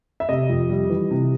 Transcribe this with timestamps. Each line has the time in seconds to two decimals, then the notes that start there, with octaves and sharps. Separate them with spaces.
0.20 E5
0.29 C3 D#5
0.49 F2
0.69 G3
0.90 E3
1.11 C3